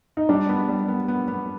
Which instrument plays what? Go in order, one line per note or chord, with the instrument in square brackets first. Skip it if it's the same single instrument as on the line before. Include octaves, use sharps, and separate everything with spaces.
[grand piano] D#4
[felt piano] G3 [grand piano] D4
[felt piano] B3
G3
B3
B3
B3